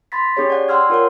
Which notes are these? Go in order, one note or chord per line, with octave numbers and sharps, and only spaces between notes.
B5 C6 A6 B6
C#4 G4 G#4 C#5
D5 F#5
F#5 G5 C6 E6 F6 G#6
F4 A#4 C#5 F#5